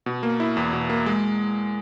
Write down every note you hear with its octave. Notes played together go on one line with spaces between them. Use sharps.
B2
A#3
E4
E2
B2
A#3
G#3